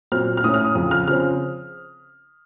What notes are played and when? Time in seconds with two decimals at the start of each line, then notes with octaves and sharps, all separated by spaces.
0.12 A#2 F#3 C4 F6
0.37 F6
0.44 A2 A3 C#4 D#6
0.54 F6
0.64 D#6
0.75 F2 C#3 F3 D#6
0.91 F6
1.08 C#3 F3 C4 F6